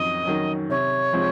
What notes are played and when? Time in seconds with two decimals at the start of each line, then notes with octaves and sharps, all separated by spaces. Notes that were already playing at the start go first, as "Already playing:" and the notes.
Already playing: F2 D#3 F#3 C#4 D#5
0.25 D#3 F#3 C#4
0.69 C3 C#5
1.13 F3 G#3 C4